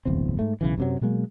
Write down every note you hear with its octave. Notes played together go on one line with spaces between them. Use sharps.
D1 G1 E2 C4
G#2 A3
B1 C#3 E3
F#2 C3 F#3
B2 F#3 G#3 A#3